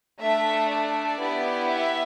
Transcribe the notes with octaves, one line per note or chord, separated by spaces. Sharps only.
A3 D4 A4 E5
D5
B3 E4 G4
E5